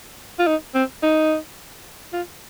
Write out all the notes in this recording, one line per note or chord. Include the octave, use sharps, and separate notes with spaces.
F4
D#4
C4
D#4
F4